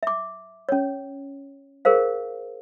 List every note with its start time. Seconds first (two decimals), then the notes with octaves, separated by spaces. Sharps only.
0.03 E5 D6
0.69 C#4 C#5
1.85 G#4 A#4 C5 F5